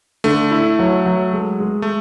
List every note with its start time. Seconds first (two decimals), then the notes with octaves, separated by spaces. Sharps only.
0.24 D3 A3
0.51 E4
0.79 F#3
1.06 F#3
1.33 G#3
1.60 G#3
1.82 A3